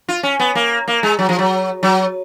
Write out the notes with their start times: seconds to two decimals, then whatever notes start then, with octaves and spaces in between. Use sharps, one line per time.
0.09 F4
0.23 C#4
0.40 B3
0.55 A#3
0.88 A#3
1.03 G#3
1.19 F#3
1.29 F3
1.39 F#3
1.83 F#3